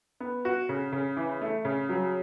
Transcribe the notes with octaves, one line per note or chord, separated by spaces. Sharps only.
B3
F#4
C#3
C#3
E3
A3
C#3
F#3